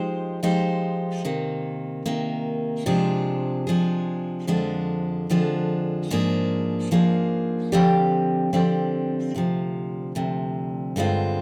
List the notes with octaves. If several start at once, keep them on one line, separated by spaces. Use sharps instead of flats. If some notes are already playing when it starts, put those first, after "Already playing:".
Already playing: F3 G#3 D#4 G4 C5
F3 G#3 D#4 G4 C5
C3 D#3 A#3
C3 D#3 A#3
C3 F3 G#3 D4 G#4
C3 F3 G#3 D4 G#4
F2 D3 F3 G#3 D4
F2 D3 F3 G#3 D4
G#2 F3 A#3 D4 G#4
G#2 F3 A#3 D4 G#4
D3 F3 C4 G4 D5
D3 F3 C4 G4 D5
D2 C3 F3
D2 C3 F3
G2 D3 G#3 C4 F4